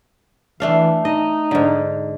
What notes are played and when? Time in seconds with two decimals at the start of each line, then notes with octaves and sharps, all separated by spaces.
0.60 E3 A3 D4 F5
1.05 D#4 D#5
1.51 G#2 D3